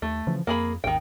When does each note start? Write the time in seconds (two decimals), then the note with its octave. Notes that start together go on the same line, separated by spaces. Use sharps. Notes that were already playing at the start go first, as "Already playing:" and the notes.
0.02 D#2 A3
0.27 C#3 E3 F3
0.47 F2 A#3 G#4 B5
0.84 G#1 D#2 D#3 G5